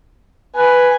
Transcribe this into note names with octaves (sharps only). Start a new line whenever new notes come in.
B4 G#5